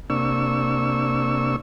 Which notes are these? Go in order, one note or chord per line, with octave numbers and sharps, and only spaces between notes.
C3 A#3 D4 C#6 E6